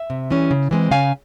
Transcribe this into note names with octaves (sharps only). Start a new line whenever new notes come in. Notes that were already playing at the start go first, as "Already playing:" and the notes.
Already playing: E5
C3
E3 G3 C#4
C#3
E3 G#3 C4
C#3 F5 G#5